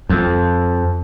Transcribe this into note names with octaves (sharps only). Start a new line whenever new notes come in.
F2